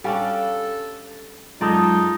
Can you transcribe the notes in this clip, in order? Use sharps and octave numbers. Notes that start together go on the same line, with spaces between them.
G3 C#4 D4 A4 F5
F#2 G#3 D#4 F4 A4 D5